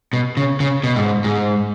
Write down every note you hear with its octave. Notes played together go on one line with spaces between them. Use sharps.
B2
C#3
C#3
B2
G#2
G#2